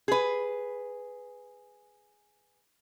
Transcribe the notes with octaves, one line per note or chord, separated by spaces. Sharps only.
G#4 B4